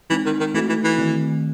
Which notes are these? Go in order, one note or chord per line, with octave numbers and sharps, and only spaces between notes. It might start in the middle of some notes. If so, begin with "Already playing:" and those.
E3 G#3 C4 D#4
D#3
D#3
E3 A3 C4 F#4 A4
E3
E3
D#3 A3 C4